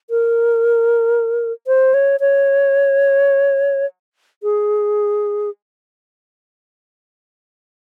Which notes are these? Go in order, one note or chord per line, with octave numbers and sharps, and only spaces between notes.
A#4
C5
C#5
C#5
G#4